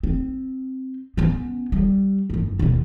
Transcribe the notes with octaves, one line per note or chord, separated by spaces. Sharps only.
C4
B3 C#4
G3
G1 F#2
D#2 B2